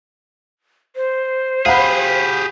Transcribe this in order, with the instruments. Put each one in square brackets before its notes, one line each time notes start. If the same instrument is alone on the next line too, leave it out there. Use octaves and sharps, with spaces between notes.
[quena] C5
[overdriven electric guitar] G4 G#4 [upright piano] F5 F#5 B5